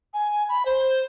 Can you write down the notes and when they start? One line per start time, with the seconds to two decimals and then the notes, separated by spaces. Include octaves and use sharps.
0.14 G#5
0.49 B5
0.66 C5